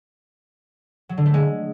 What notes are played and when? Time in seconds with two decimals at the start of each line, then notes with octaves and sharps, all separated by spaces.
1.09 F#3
1.18 D3
1.26 A3
1.34 G#3